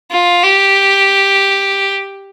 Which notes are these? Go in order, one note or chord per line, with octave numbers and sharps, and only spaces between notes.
F4
G4